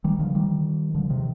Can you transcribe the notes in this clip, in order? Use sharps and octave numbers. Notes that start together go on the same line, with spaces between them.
D#3 G3
D3 F3
D#3 G3
D3 F3
C3 D#3